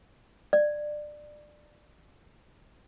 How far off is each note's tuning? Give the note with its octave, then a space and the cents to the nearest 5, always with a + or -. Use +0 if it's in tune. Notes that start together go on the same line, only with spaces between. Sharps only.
D5 +20